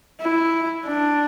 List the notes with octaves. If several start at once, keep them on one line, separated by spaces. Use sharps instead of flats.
E4
D4